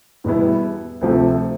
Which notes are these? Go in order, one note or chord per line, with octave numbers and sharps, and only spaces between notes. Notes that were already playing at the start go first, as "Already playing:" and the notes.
E2 B2 G3 B3 E4
D2 C3 F3 A3